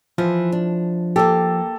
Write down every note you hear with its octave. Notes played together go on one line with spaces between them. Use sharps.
E3 F3
D4
A#3 G4 A4